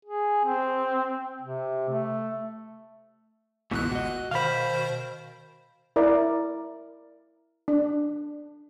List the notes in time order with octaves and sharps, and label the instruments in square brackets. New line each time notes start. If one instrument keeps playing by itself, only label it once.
[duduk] G#4
C4
C3
A3
[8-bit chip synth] G1 C#2 F#6 [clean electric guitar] G#2 B2 E3
[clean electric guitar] F#4 D#5
[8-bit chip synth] B2 D#3 C5 [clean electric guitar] F5 B5
[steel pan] E4 A#4 D5
D4